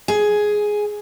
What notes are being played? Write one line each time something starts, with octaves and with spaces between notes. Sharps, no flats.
G#4